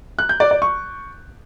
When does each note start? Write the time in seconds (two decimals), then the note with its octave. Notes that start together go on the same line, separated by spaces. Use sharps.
0.19 F#6
0.29 G6
0.40 D5
0.51 D5
0.62 C#6